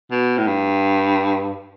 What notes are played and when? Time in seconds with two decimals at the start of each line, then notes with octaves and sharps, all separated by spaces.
0.11 B2
0.38 A2
0.47 G2